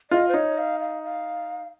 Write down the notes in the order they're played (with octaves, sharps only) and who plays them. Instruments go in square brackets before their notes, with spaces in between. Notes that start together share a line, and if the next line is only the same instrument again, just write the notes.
[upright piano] F4 [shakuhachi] D#5
[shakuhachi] C5
[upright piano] D#4 [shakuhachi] C#5
[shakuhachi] F5
F5
F5